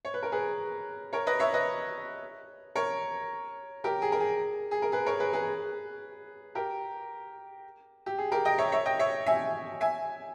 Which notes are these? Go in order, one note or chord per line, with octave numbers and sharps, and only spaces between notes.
C#5
B4
A#4
G#4 B4
A#4 C#5
B4 D#5
C#5 E5
B4 D#5
A#4 C#5
G4 A#4
G#4
A#4
G#4
G#4
A#4
G#4 B4
A#4 C#5
G#4 B4
G#4 B4
G4 A#4
G4
G#4
G4 A#4
D#5 G5
C#5 E5
C#5 E5
D#5 G5
C#5 E5
E5 G#5
E5 G#5